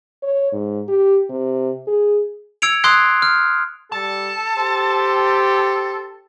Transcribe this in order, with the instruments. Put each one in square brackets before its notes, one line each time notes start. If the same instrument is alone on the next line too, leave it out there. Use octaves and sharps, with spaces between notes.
[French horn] C#5
G#2
G4
C3
G#4
[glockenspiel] E6 G#6 C#7 D7 F7
C6 D#6 F#6 G#6 C7 D7
F6
[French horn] G3 [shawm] A4 [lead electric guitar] A5
[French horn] G4 [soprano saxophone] C5